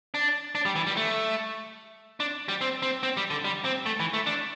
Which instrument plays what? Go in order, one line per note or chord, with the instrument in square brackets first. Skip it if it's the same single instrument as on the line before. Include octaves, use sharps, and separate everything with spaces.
[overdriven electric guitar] D4
D4
G3
E3
G3
A3
D4
G3
C4
C4
C4
G3
D3
G3
C4
A3
E3
A3
D4